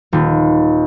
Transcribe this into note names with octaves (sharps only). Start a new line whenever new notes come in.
D#1